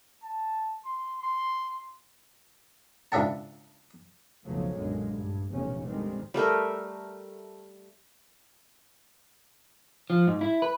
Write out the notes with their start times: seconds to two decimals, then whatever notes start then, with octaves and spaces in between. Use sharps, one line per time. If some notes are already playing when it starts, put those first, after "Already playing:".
0.23 A5
0.85 C6
1.23 C6
3.12 C#2 G#2 D4 E5 F#5 A5
4.45 B1 F2 C#3 F3 F#3 A3
4.76 B1 F#2 A#2 D3 G#3
5.14 G2
5.51 F1 B1 E2 A#2 A3 C#4
5.86 G#1 D2 D#3 G3 G#3 C4
6.34 G3 A3 A#4 E5
10.10 F3
10.27 G#2
10.41 E4
10.62 B4